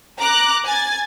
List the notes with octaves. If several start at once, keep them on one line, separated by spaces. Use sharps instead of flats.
A#5 D6 F#6
G#5 G#6 A6